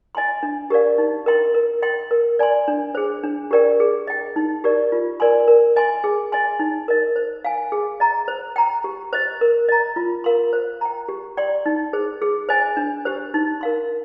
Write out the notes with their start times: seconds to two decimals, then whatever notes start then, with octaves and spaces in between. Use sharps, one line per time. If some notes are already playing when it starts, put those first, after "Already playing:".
0.15 D#5 G#5 C6
0.43 D4
0.70 G4 A#4 D5 F5
0.98 D#4
1.26 A#4 D#5 G5 C6
1.54 A#4
1.82 D#5 G5 C6
2.11 A#4
2.39 D5 G#5 C6
2.68 D4
2.95 G#4 C5
3.24 D4
3.51 G4 A#4 D5 G5
3.80 G#4
4.07 D#5 G5
4.36 D#4
4.64 G4 A#4 D5
4.92 F4
5.20 A#4 D5 G#5 C6
5.48 A#4
5.76 D#5 G#5 C6
6.04 G#4
6.32 D#5 G#5 C6
6.59 D#4
6.88 A#4 D#5
7.16 C5
7.45 F5 G#5
7.72 G#4
8.00 D#5 A#5
8.28 C5
8.56 G5 A#5
8.84 G4
9.13 C5 D#5
9.41 A#4
9.69 D#5 A#5
9.96 F4
10.24 A#4 F5 C6
10.53 C5
10.81 G5 A#5
11.08 G4
11.37 D5 G5 C6
11.66 D#4
11.93 G#4 C5
12.22 G#4
12.49 C5 D#5 G#5
12.77 D4
13.05 G4 C5
13.34 D#4
13.61 A#4 F5 C6